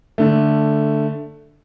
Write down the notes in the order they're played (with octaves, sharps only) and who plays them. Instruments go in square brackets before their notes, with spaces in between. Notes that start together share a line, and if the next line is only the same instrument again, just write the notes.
[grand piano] D3 A3